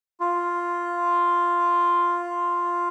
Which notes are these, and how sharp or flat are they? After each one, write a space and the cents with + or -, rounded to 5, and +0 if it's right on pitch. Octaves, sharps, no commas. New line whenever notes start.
F4 +0